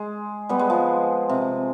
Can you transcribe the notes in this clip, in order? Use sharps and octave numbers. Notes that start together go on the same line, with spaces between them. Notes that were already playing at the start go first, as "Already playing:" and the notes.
Already playing: G#3
G3 B3
G#3
F3
C3